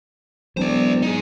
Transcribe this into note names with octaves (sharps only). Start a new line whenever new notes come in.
E1 F#3 B3 C5 D5
D#4 G#4